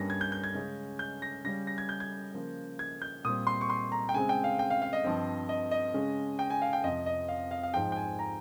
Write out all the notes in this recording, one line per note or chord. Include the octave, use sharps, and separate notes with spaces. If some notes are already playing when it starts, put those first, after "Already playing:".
Already playing: G2 G3 A#3 C#4 A#6
G#6
G6
G6
G#6
C#3 G#3 C#4
G6
A#6
C#3 G3 C#4 A#6
A#6
G#6
G6
G#6
C#3 F3 A#3
G#6
G6
A#2 G3 C4 D#6
C6
C#6
C6
A#5
G5
C#3 G#3 C4 G#5
G5
F5
G5
F5
F5
D#5
G2 F3 C4
D#5
D#5
C#3 G#3 C#4
G5
G#5
F5
G5
F2 C3 F3 D#5
D#5
F5
F5
F5
G#2 F3 G#3 G5
G5
G#5
A#5